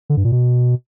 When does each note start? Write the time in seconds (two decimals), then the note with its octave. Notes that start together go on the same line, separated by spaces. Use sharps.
0.10 D3
0.17 G2
0.25 A#2
0.32 B2